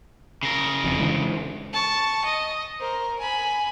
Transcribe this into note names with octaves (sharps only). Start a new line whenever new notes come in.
C#3 A#4
F#1 F2
D3 E3 G#3
A5 C#6
D#5
A#4 C5
G#5 B5